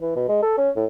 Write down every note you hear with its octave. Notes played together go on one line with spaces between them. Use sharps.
E3
B2
G#3
A4
C#4
A2